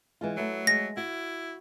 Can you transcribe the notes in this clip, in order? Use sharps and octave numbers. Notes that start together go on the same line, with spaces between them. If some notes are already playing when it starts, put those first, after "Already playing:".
E3 G#3 F4
F#3 A3 E4
G#3 A#6
E4 F#4